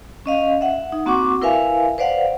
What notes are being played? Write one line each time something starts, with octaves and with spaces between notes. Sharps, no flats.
C#4 D#5 F5
E5 F#5
D#4
A#3 C4 F#4 F#5 C#6 D6
E4 A#4 B4 E5 F5 G#5
B4 C5 D5 F5 F#5